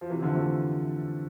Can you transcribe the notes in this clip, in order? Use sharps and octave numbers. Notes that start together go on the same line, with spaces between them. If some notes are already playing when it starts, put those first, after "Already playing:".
F3
C3 E3
D3 F3
F3 A3